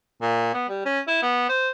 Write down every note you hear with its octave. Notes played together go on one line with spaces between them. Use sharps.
A#2
B3
G3
C#4
E4
B3
C5